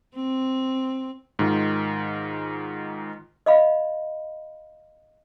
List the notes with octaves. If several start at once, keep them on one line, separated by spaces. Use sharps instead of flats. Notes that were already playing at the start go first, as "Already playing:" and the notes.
C4
G#2 D#3 F4
D#5 F5 B5